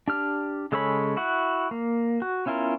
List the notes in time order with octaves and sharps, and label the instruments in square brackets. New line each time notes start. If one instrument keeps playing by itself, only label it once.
[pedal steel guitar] D4 G4 F6
C#3 G#3 A4 C#5 B5
E4 F#4 F#5
A#3
F#4
B3 C#4 E4 F4 A#4